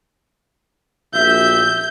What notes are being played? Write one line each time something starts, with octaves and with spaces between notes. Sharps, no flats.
A#1 F#4 E5 G6